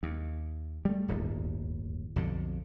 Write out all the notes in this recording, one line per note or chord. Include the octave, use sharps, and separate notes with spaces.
D#2
G3 A3
D1 G1 D#2
B1 F2 D3